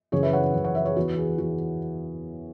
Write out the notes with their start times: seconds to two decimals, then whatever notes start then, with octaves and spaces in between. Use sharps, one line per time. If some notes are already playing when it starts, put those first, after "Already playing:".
0.12 F#2 C#3 E3 G#4 C#5
0.23 B4 E5
0.33 C#5 F#5
0.54 F#2 C#3 E3
0.64 C#5 F#5
0.75 B4 E5
0.85 G#4 C#5
0.96 E2 E3 F#4 B4
1.18 G#4
1.38 E2 E3 F#4